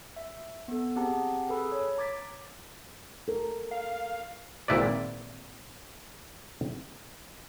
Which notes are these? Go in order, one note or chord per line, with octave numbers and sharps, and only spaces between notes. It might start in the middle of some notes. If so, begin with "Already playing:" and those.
E5
B3 A4
C4 G4 G#4 F#5 A5 A#5
G#4 A4 B4 B5 E6
C#5
A#5 D6 G#6 A6 B6
A4 A#4
F5
G#1 A#2 E4 B4 D5